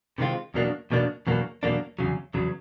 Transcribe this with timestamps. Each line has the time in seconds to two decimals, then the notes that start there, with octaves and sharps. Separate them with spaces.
0.18 C3 D#3 G#3 C4 F4
0.54 E2 B2 F#3 A#3 D4
0.91 E2 B2 F#3 A#3 D4
1.27 E2 B2 F#3 A#3 D4
1.63 E2 B2 F#3 A#3 D4
1.99 E2 C#3 F#3
2.34 E2 C#3 F#3